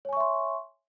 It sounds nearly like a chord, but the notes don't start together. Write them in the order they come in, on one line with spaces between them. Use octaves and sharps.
C#5 G#5 C#6 E5 C6